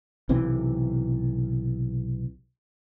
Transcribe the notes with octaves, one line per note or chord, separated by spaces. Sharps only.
B1 C3 E3 C4